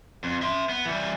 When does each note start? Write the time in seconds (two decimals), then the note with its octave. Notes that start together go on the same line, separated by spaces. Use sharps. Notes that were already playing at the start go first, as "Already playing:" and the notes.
0.24 F2
0.42 E5 C6
0.69 B3
0.85 E3 G3